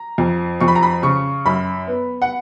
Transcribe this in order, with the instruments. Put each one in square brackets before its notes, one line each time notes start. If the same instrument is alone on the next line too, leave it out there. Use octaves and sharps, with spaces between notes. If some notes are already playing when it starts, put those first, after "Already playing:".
Already playing: [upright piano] A#5
F2
F2 C#6
B5
A#5
B5
C#3 C#6
F#2 B5
B3
F#5